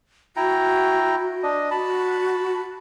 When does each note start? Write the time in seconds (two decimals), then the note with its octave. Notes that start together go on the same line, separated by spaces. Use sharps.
0.36 E4 F#4 G5 A#5
1.43 D4 D#5
1.71 F#4 A5 B5